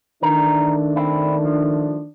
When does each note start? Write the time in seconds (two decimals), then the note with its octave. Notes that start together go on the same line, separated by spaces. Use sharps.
0.22 D#3 E3 A3 D4 A#4
0.96 C4 E4
1.44 F3